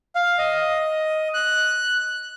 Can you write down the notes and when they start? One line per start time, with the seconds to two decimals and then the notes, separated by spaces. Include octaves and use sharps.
0.15 F5
0.38 D#5
1.34 F#6